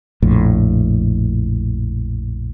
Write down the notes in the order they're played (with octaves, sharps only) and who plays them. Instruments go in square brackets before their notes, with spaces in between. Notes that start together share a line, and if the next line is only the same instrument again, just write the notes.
[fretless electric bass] A#1 F2 A2